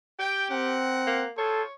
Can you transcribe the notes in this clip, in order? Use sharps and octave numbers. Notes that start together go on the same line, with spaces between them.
G4 G5
C4 A#4 F#5
A#3
F4 G#4 A4 C5 C#5